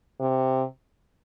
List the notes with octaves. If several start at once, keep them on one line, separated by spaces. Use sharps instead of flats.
C3